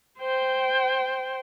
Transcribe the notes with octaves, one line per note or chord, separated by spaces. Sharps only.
C5 G5